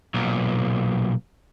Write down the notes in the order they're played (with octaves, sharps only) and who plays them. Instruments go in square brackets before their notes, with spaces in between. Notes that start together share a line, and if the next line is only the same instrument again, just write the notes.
[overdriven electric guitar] B1 A#2